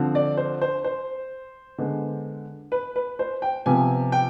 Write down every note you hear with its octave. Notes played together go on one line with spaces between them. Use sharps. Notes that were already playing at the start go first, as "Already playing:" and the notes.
Already playing: D3 F3 C4
D5
C5
C5
C5
D3 G#3 B3
B4
B4
C5
G5
C3 F3 B3 G#5
G5